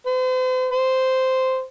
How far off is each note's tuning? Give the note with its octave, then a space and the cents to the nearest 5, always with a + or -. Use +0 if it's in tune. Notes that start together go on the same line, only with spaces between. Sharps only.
C5 -40
C5 -10